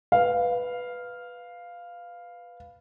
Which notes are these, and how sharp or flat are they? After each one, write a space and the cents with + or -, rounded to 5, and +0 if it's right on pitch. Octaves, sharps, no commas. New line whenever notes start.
B4 +0 F5 +0